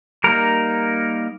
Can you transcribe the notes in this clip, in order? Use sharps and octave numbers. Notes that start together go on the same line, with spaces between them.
G3 A#3 D#4 A#4